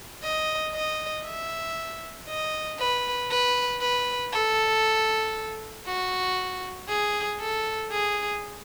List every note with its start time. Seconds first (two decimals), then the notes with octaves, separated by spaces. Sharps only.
0.23 D#5
0.74 D#5
1.25 E5
2.28 D#5
2.79 B4
3.30 B4
3.81 B4
4.32 A4
5.86 F#4
6.88 G#4
7.40 A4
7.91 G#4